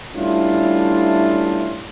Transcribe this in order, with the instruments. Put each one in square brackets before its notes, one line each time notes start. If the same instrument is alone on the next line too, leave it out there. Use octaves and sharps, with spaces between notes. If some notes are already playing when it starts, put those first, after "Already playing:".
[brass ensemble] G3 A3 C#4 D4 E4 F4